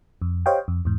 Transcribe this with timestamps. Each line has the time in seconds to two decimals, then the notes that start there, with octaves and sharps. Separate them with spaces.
0.22 F2
0.46 G4 C5 C#5 D#5 F5 G5
0.68 F2
0.85 E2 G#2